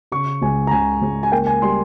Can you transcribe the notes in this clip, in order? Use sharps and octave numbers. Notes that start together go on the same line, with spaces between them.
C#3 C#6
C#2 G#5
A#5
C#2 G#5
C#2
G#5
A#3 G5
G#5
G3 C6